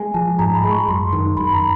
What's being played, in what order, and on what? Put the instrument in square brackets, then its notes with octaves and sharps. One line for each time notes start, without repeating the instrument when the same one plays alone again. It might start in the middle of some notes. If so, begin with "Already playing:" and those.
Already playing: [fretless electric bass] G#3 [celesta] G#5
[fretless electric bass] F3 [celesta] A5
[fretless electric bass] G#2 [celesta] A#5
[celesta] B5
[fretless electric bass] G#3
[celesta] C#6
[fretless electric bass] F#2 [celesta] C6
[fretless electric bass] D#3
[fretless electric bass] F#2 [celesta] B5
[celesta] A#5